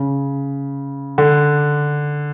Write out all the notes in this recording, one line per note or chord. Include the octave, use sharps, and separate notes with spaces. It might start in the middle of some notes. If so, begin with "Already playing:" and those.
Already playing: C#3
D3